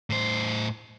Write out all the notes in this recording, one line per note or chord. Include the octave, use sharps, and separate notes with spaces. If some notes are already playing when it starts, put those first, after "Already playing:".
A2 C5